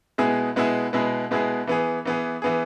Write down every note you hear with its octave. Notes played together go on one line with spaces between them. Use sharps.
B2 G#3 B3 E4 G#4
B2 G#3 B3 E4 G#4
B2 G#3 B3 E4 G#4
B2 G#3 B3 E4 G#4
E3 B3 G#4
E3 B3 G#4
E3 B3 G#4